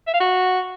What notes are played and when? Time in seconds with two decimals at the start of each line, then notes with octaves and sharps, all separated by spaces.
0.07 E5
0.14 F5
0.20 F#4